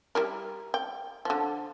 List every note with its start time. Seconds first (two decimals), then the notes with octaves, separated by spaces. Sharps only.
0.15 G3 E4 A#4
0.74 G5
1.25 D3 F3